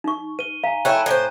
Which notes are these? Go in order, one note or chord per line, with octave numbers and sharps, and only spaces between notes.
D#4 C#6
B4 D#7 G7
F5 G#5 A#5
A3 E4 C#5 G5 C#6 F#6
A2 C5